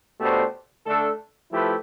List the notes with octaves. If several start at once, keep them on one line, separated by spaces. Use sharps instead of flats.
B2 A3 D4 G4 C5
D3 A3 D4 A4
F3 A3 E4 G4 B4